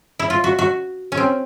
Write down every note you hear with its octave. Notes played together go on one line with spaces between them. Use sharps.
E4
F4
F#4
F#4
C#4
C4